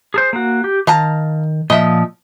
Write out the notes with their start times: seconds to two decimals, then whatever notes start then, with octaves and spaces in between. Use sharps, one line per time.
0.14 G#4 A4 C5
0.33 A#3 F#4
0.64 G4
0.87 D#3 F5 A5 A#5
1.70 A#2 F3 D#5 E5